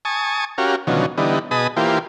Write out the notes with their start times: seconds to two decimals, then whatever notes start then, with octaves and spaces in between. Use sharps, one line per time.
0.05 G#5 A5 C#6 D#6
0.58 C#4 F#4 G4 A#4 F5
0.87 B2 D3 D#3 F3 F#3 C#4
1.18 D3 E3 G3 B3 D#4
1.51 B2 G#4 D#5 A5 B5 D#6
1.77 E3 A#3 F4 G4 C5